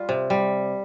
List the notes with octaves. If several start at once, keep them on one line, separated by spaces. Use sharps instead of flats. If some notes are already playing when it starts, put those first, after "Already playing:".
Already playing: G3 F4
C3
G3